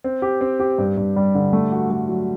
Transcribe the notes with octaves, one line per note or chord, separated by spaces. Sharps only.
C4
G4
C4
G4
G2
G2
G3
D3
A3
F#4
A3
F#3